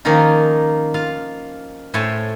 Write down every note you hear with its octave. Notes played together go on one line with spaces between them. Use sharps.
D#3 F3 A#3 C#4 D#4 F4
F4 F5
A2 C5 C#5 E5 G#5 A5